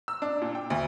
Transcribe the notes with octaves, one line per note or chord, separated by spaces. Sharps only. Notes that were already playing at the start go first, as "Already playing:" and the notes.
E6
D4
A#2
G5
D2